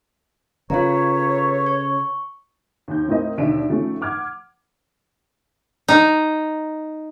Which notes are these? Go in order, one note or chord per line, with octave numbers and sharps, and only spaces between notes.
C#3 F4 A4 B4 C#5 A#5
C#6
D#2 G6
A2 C4 E4 A#4 D#5
D#2 B2 D3 D5 E5 D7
D#3 F3 A3 C#4
F#5 D6 F6 G#6
D#4